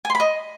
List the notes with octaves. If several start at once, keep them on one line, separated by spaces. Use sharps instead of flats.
G#5
C6
B5
D#5